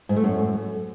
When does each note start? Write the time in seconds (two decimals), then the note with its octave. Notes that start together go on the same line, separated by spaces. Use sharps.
0.09 G#2
0.16 A3
0.24 F#2